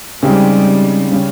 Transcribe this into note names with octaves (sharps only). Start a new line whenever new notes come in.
C#3 G3 G#3 C4 D#4 G4
C#3 G3 C#4